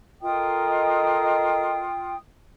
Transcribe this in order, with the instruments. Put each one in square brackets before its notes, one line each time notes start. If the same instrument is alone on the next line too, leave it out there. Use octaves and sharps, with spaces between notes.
[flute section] F4 G5 D#6 [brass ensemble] A4 A#4 D#5